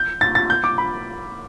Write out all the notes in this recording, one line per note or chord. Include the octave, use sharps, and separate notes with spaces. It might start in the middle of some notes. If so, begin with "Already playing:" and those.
Already playing: G6
A6
A6
G6
D6
B5